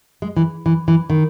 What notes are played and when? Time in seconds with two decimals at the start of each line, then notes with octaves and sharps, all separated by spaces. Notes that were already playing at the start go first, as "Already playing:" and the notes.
0.22 G#3
0.37 E3
0.66 E3
0.88 E3
1.10 D#3